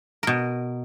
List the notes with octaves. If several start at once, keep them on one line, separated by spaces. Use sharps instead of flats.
B2 A#4